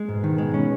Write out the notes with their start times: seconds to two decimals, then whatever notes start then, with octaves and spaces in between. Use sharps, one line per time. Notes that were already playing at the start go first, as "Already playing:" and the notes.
Already playing: G#3
0.09 G#2 B2
0.24 D#3
0.38 G#3
0.54 C#4